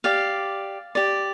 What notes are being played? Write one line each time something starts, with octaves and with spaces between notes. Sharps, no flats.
G4 D5 F5
G4 D5